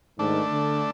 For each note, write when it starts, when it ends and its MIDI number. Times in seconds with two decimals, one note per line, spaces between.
0.19 0.41 44
0.19 0.41 51
0.19 0.91 57
0.19 0.91 62
0.51 0.84 50